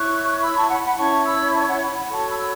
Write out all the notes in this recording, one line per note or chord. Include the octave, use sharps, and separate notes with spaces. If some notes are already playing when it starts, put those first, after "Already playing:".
Already playing: E4 C#5 C#6 F#6
B5 E6
A5 C#6
F#5 B5
F#5 B5
C#4 E4 C#5 A5 C#6
B5 E6
A5 C#6
F#5 B5
F#5 B5
F#5 B5
F#4 A4 C#5 A5 C#6
B5 E6
E6